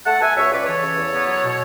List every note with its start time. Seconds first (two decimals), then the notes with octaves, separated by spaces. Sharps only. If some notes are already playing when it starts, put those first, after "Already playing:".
0.06 A3 F#5 A5
0.21 B2 E5 G#5
0.36 C#2 C#5 E5
0.51 C#2 B4 D5
0.66 E3 A4 C#5
0.83 C#3
0.97 E2
1.13 B3
1.28 F#3
1.42 B2